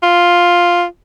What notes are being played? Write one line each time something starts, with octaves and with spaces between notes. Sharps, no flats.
F4